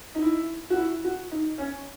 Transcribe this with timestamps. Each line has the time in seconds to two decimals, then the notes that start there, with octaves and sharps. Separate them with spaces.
0.15 D#4
0.22 E4
0.70 F#4
0.77 E4
1.04 F#4
1.31 D#4
1.58 C#4